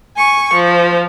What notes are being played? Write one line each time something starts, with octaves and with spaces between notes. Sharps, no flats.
G#5 C#6
F3